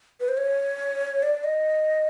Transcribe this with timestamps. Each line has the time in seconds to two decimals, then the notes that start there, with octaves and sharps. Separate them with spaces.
0.20 B4
0.28 C5
0.37 C#5
1.23 D5
1.44 D#5